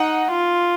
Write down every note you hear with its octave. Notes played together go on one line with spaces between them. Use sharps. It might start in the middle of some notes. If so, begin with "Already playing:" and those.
Already playing: D#4 F#5
F4